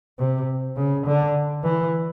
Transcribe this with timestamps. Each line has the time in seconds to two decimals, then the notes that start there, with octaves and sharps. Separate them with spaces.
0.19 C3
0.77 C#3
1.06 D3
1.64 E3